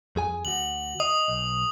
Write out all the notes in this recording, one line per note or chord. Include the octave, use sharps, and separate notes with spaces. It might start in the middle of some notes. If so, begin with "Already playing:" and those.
F2 G#4 G#5
D2 F#4 F#7
D#5 D#6
B1